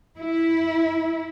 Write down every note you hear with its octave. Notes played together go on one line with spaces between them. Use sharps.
E4